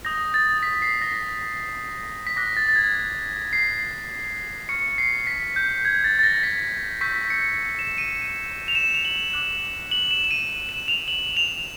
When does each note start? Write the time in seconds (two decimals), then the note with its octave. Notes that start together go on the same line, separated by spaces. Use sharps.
0.05 D#6 G6 A#6
0.34 A6
0.63 B6
0.82 C7
1.02 A#6
2.27 B6
2.36 D6 F#6 A#6
2.57 A6
2.69 A6
2.76 G#6
3.53 C7
4.69 C#6 F6 C#7
4.88 C#7
4.98 C7
5.27 B6
5.56 G6
5.85 G#6
6.04 A6
6.19 A6
6.23 A#6
6.43 B6
7.01 C#6 E6 G6 B6
7.30 C#7
7.79 E7
7.98 D#7
8.68 F7
8.75 E7
8.95 F7
9.05 F#7
9.33 D6 F#6 F#7
9.91 F#7
10.11 E7
10.24 E7
10.31 D#7
10.50 D#7
10.69 E7
10.88 F7
11.08 F#7
11.37 F7